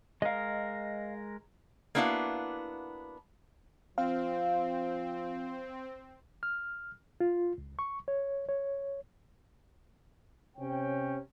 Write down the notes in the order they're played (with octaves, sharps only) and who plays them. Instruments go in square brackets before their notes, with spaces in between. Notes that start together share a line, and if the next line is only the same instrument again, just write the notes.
[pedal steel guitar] G#3 A#4 [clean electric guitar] D#5 F5
[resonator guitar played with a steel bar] A#3 B3 D4 E4 F#4 F5
[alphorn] F3 [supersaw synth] C4 [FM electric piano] F5
[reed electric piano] F6
F4
C#2
C#6
C#5
C#5
[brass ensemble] C3 C#4 G5